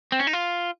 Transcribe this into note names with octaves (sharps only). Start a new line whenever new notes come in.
C4
C#4
D#4
F4